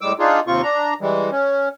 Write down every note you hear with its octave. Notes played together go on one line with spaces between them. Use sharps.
A2 G3 G#3 D6 E6
D4 D#4 F4 G#4
D#2 C3 C4 F4 C#6
D4 A#5
E3 G3 G#3
C#4